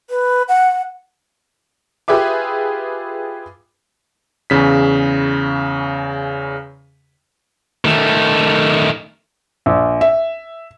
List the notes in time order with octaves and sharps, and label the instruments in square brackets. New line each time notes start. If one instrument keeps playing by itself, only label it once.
[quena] B4
F#5
[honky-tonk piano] F4 G4 G#4 B4 E5 D6
[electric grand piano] E2 C#3 B6
[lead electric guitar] D#3 A3
[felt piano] A#1
E5